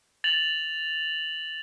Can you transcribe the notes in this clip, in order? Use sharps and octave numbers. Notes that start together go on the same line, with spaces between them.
A6 F7 F#7